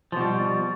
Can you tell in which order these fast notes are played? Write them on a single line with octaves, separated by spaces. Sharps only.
F3 B2 G3